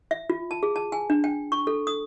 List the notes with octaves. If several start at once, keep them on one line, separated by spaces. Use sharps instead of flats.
E5
F4
A5
G#4
A5
G#5
D4
G5
C#6
A4
D#6